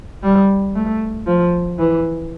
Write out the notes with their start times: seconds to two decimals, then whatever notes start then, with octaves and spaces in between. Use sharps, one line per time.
0.23 G3
0.75 A3
1.27 F3
1.79 E3